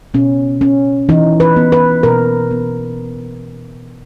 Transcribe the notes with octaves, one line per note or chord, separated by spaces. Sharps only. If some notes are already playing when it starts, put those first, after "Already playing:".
B2 C#4
C#4
E3 D#4
B4
B3
B4
B2 A#4
B3